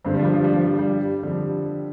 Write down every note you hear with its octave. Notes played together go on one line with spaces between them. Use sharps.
G2 D3 C4
G3
F3
G3
F3
G3
F3
G3
G3
F2 D3 G3